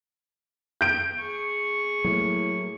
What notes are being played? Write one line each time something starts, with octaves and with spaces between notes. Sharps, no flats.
G6 D7
G#4 C#6
A2 F#3 A#3